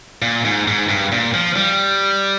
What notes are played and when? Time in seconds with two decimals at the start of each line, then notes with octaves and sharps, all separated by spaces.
0.22 A#2
0.45 G#2
0.68 G#2
0.89 G2
1.12 A#2
1.34 F3
1.56 G3